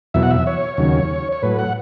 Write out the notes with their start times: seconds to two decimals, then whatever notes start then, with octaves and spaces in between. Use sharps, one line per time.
0.14 E2 B2 F#3 E5
0.23 F#5
0.30 E5
0.47 C#5
0.78 D#2 C#3 F#3
1.32 C#5
1.43 A2 F#3 B4
1.59 F#5